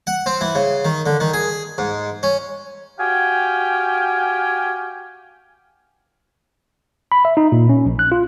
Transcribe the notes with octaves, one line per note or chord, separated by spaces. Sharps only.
F#5
C4
E3
C#3
D#3
D3
D#3
G#4
G#2
C#4
F#4 G4 F5 G5 G#5
B5
E5
D#4
A#2
C#4
A#1
F#6
F4